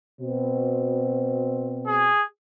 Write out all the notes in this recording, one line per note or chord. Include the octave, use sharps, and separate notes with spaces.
B2 C4
G#4